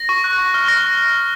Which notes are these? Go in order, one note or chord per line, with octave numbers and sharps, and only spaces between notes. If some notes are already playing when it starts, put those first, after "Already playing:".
Already playing: A#6
C#6
F#6
C#6
F6
C#6 A#6